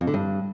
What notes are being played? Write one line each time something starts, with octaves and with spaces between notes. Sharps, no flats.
F2
D3
G2